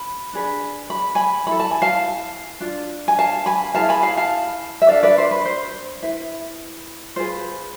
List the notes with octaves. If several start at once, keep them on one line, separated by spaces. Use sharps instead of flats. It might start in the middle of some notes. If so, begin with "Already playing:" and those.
Already playing: B5
D4 G#4 B4
B5
G#5 B5
E4 A4 B5
A5
G#5
F5 A5
D4 F4
G#5
F5 A5
G#5 B5
E4 G#4 B4 F5 A5
G#5 B5
F5 A5
F5 A5
E5
D4 A4 D5 F5
B4 D5
C5
B4
C5
E4 B4
F4 G#4 B4 C5